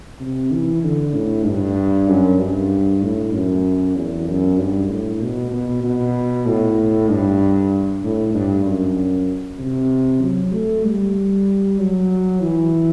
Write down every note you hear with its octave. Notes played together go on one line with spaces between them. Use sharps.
C3
E3
D3
A2
G2
F#2
G2
A2
F#2
E2
F#2
G2
A2
B2
B2
B2
A2
G2
A2
G2
F#2
C3
F#3
A3
G3
F#3
E3